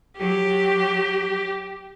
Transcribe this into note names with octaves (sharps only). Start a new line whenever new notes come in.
F#3 G4